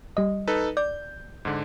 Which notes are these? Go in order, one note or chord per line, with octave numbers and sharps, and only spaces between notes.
G3 D#5
D#4 A4 B4
D5 G6
G#2 D3